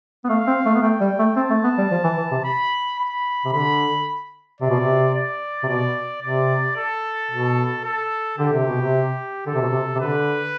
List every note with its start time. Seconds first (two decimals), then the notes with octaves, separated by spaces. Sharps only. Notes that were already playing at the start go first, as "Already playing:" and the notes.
0.24 B3
0.29 A3 F5
0.47 C4
0.65 A3
0.74 B3
0.82 A3 G5
1.00 G3
1.19 A3
1.36 C4 A5
1.50 A3
1.64 B3
1.78 G3
1.91 F3
2.04 E3
2.18 E3
2.31 C3
2.44 B5
2.99 B5
3.45 C3
3.52 D3 B5
4.61 C3 D5
4.69 B2
4.80 C3
5.14 D5
5.63 C3
5.68 B2 D5
6.22 C3 D5
6.76 A4
7.31 B2
7.84 A4
8.38 D3 G4
8.53 C3
8.67 B2
8.81 C3
9.46 D3 A4
9.54 C3
9.61 B2
9.69 C3
9.95 C3
10.00 D3 B4